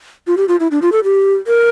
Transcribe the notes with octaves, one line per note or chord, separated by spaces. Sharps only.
F4
G4
F4
E4
D4
F4
A4
G4
A#4